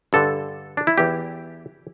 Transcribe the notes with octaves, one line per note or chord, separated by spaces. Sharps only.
G2 D3 A4
D4
E4
E2 E3 G4